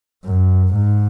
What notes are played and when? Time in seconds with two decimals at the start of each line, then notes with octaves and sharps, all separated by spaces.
0.25 F#2
0.74 G#2